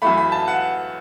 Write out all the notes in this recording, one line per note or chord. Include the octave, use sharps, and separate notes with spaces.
F#2 E3 A3 B5
B5
A5
F#5